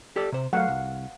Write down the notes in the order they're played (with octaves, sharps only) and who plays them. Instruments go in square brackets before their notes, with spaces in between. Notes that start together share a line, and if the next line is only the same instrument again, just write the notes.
[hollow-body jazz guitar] G4 A4 D5
C3 C5
[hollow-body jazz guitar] F#3 A3 [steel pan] F5 F#5
[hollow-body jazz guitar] C2